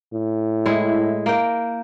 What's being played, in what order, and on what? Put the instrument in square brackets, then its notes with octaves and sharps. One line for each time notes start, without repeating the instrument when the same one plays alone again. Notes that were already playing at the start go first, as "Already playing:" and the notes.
[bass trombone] A2
[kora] G#3 E4
A#3 G5